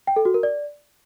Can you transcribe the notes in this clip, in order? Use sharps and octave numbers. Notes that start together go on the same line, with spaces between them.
G5
A4
F#4
A#4
D5